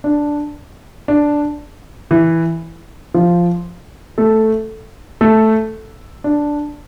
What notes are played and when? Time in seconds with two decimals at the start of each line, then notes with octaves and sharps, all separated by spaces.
0.04 D4
1.08 D4
2.11 E3 E4
3.14 F3 F4
4.18 A3 A4
5.21 A3 A4
6.24 D4